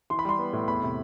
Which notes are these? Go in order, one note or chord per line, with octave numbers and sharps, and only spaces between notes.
E3 C6
B5
G3 C6
B3
A2
E2 B5
C3